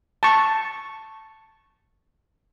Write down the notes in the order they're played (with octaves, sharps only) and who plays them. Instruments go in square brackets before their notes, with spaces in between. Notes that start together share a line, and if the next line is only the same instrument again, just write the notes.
[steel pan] A5 C#6